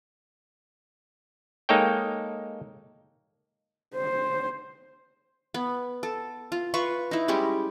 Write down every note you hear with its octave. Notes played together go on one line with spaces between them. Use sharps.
G#3 A#3 D#4 A4 C#5 G5
C5
B3
A4
F4
F4 B4 C#6
D#4 E4
G3 G#3 C#4 G4